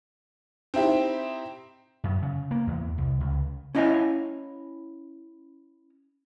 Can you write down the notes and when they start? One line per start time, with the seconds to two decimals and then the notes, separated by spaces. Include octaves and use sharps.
0.74 C4 D#4 E4 G4
2.04 F#2
2.22 C#3
2.51 A#3
2.67 E2
2.98 C2
3.20 C#2
3.75 C#4 E4 D#5 F5 G#5